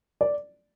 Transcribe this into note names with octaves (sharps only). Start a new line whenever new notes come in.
D5